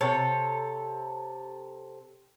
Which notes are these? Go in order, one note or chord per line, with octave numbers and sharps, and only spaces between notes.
C3 A4 C#5